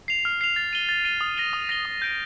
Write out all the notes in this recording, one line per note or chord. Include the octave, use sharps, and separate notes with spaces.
C7 F7
F6
C7 F7
A6
D#7 G7
A6
D#7 G7
D#6
A#6 D#7 G7
D#6
A#6 D#7 G7
D#6
G6 D7